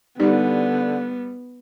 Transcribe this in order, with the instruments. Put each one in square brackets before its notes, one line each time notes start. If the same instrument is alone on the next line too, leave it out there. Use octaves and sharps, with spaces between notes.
[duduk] D3 [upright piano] G3 [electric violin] B3 [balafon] D#4 G4